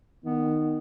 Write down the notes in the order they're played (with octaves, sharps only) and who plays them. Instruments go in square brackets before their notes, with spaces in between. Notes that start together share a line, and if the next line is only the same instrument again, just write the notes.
[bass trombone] D#3 [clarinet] B3